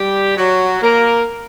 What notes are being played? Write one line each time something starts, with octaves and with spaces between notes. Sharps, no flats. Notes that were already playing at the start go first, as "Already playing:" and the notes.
Already playing: G3 G4
F#3 F#4
A#3 A#4